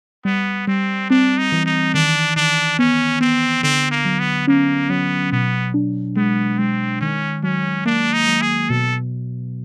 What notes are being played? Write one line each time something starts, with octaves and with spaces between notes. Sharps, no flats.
G3 B3
G3 C4
C4 D4
D#4
E3
D#4
D#3 D4
D#3 D4
B3 C#4
B3 C4
D3 C4
A#3
F#3
B3
A#3 C#4
F#3 B3
B2 B3
D4
G#3 B3
G#3 C4
D#3 C#4
F#3 C#4
A#3 D4
D#4
F#3
G#4
B2 A4